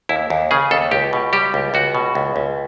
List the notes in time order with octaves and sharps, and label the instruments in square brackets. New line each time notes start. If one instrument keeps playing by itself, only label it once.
[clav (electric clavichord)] D#2 E4
D#2
C#3 G#4
D#2 A4
C#2 G4
B2
G3 G4
C#2
C#2 F#4
B2
C#2
C#2